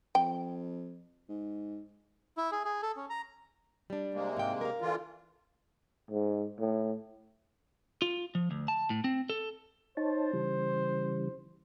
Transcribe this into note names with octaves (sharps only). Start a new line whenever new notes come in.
F2 G5
G#2
E4
G#4
G#4
A4
C#4
A#5
G3 D4
C3 G#3 A#3
G#2 G5
A#4 F5
D3 E3 F4
G#2
A2
F4
F3
D2
A5
A2
C4
A4
D#4 C5 C#5 A5
C#3 E3 G3